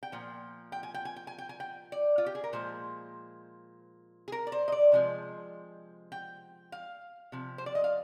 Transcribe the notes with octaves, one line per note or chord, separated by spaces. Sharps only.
G5
A#2 F3
G5
G#5
G5
G#5
G5
G#5
G5
G#5
G5
D5
F4
G4
G#4
A#4
A#2 F3 G#3 C5
G#4
A#4
D5
C5
D#5
D5
C3 F3 G#3
G5
F5
C3 F3
C5
D5
D#5
F5